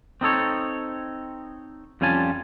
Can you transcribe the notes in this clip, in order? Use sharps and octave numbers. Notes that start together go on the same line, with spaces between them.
C4 D#4 A4 C#5
F2 G3 C#4 F4 G#5 A5